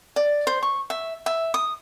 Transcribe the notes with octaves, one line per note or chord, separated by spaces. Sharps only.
D5
C5
C#6
E5
E5
D#6